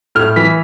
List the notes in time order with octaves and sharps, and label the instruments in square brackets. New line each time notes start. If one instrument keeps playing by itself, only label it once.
[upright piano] A2 F6
E3 B6